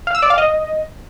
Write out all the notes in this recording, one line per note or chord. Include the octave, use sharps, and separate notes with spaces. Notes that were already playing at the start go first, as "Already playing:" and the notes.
F5
E6
D5
F5
D#5